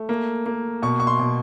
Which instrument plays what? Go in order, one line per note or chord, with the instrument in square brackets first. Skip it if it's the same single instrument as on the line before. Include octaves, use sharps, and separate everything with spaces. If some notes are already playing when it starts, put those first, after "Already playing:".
Already playing: [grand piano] A3
A#3
A#3
B2 C#6
C#6
C6
B2